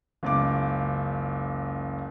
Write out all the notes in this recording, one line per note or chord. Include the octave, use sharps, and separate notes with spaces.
F#1 C#2 D6